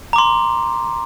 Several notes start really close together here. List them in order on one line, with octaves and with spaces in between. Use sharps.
A#5 D6 C6